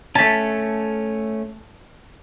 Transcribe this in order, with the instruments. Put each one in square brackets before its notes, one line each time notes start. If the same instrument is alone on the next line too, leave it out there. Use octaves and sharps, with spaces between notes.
[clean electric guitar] A3 C#4 [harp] A5 B6